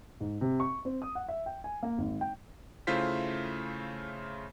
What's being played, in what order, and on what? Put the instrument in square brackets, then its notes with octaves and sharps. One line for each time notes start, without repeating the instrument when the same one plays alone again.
[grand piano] G#2
C3
C#6
C4
D#6
F#5
E5
G5
G#5
A#3
G#1
G5
[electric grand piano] C#3 A3 E4 F4 C5 B6